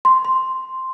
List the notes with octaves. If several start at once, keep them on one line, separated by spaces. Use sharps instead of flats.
C6
C6